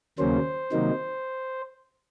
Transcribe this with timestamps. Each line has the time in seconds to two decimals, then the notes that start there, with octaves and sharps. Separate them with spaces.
0.19 D#2 C#3 F#3 A#3 C#4 C5
0.72 C3 D#3 F#3 A#3 D#4